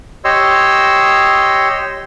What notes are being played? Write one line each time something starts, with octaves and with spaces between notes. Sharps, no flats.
G4 C#5 D#5 C6 E6